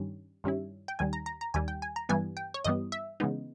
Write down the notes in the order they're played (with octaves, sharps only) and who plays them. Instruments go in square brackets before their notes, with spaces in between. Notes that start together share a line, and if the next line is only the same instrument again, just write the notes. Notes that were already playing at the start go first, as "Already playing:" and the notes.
Already playing: [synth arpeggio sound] G2 D#3 G3 C#4
G2 D#3 G3 C#4 E4
G5
D#2 D#3 G3 G#5
A#5
A#5
A#5
D#2 D#3 G3 G#5
G5
G#5
A#5
G2 E3 G3 B3 G#5
G5
C#5
G2 E3 G3 B3 D#5
E5
C#3 E3 G#3 B3 D#4